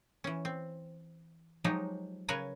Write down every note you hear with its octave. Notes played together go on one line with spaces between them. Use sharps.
E3 C#4
C4
F3 F#3 G#3 D#4 G4
C#3 A#4 B4 C#5 G#5 A#5